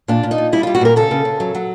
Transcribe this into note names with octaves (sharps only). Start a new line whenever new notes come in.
A#2 D4
A#2
D#4
A#2
G3 E4
F4
G3
F#4
A#2 A#4
C#3 A4
C#3
C#3
F#3
F#3